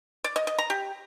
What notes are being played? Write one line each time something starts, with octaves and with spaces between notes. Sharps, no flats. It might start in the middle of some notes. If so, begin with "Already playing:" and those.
D5
D#5
D#5
A#5
G4